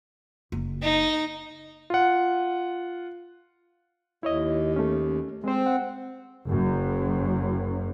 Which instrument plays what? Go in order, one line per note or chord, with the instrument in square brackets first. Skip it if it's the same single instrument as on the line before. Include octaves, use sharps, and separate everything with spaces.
[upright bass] F#1
[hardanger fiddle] D#4
[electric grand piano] F4 F#5
[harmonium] D#2 [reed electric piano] E4 C#5 D#5
[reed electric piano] A3 C#4
[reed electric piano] G#3 C5 [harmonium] C4
[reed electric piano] F#5
[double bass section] F#1 F#2